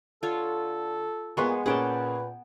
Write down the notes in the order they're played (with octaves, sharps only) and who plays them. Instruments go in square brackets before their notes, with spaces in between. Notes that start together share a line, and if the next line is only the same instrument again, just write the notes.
[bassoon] D3 [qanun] F4 C#5 [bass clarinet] A4
[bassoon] A#2 [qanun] G#3 B3 G#4 [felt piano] B4 C6 C#6
[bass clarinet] A#2 [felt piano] A#3 C#4 G#4 [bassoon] B4 [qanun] F#5 G5 A5